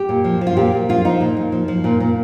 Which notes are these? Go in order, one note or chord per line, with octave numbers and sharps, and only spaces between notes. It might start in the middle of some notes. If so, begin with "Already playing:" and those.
Already playing: G4
A#2
F3
F3
F4
A#2 G4
A#2
F3 F4
F3 D#4
A#2
A#2
F3
F3
A#2
A#2